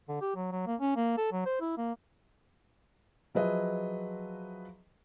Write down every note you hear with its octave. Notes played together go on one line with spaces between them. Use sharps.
D3
G4
F#3
F#3
A#3
C#4
A#3
A4
F#3
C5
E4
A#3
F3 F#3 G#4 B4 D#5 E5